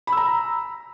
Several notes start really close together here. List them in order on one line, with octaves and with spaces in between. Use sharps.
B5 E6 A#5